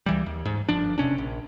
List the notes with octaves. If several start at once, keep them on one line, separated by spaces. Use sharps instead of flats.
C#2 E3 G3
D#2
G#2
G1 F3 D4
E1 C3 C#4 D4
A#1